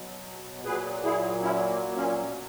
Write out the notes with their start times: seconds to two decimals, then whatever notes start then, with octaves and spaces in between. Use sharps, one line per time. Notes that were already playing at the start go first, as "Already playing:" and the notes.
Already playing: B2 F#3
0.64 A#2 F#3 G#4 B4
1.04 E4 G#4
1.43 C#4 E4
1.69 A#3
1.96 A#3 C#4
2.22 B2 A#3 C#4
2.26 F#3